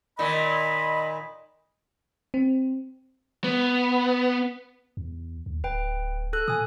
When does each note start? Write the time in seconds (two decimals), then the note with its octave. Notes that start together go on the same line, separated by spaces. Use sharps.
0.19 A#2 D#3 D#5 B5
2.34 C4
3.44 B3
4.97 E2
5.46 D#2
5.64 D1 B4 G5
6.33 A4 F#6
6.48 A#2 G#5 D#6